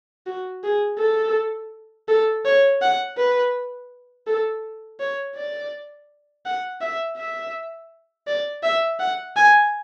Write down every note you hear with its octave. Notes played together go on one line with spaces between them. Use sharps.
F#4
G#4
A4
A4
C#5
F#5
B4
A4
C#5
D5
F#5
E5
E5
D5
E5
F#5
G#5